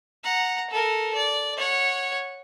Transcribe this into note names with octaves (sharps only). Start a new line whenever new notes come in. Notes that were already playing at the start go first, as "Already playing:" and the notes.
F#5 A#5
A4 A#4
D5
C#5 F#5